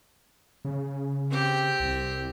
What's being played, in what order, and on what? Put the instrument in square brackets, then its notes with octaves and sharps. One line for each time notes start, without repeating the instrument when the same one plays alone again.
[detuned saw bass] C#3
[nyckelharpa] C4 G4
[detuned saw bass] C2